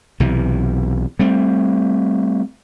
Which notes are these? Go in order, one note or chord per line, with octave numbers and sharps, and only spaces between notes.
B1 C3 E3
G3 A3 C4